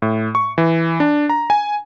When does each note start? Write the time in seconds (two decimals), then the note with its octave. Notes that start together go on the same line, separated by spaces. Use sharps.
0.02 A2
0.35 C#6
0.58 E3
1.00 D4
1.29 A#5
1.50 G#5